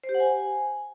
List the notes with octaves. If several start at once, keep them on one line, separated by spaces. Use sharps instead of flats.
C5
G4
F#5
G#5